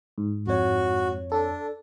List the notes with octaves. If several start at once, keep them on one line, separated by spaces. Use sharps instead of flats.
G#2
F2 F#4 C#5
D4 A4